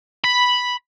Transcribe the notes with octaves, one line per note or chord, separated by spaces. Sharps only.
B5